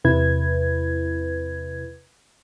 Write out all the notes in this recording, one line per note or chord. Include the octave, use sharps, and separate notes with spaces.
E2 C3 E4 B4 G#6